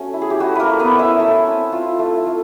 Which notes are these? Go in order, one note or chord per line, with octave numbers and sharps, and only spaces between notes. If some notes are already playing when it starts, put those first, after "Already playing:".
Already playing: A3 C#4 F#4
E4
G#4
G4
A3 F#4
A#3 A#4 B4
A3
B3 B4
C#4
E4 E5
A3
C4
F4
A3
A3